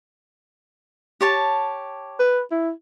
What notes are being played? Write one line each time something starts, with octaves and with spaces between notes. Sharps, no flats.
G4 C#5 A5
B4
E4